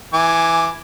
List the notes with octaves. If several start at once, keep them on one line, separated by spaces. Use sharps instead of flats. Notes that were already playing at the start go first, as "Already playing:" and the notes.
E3 G#5 D6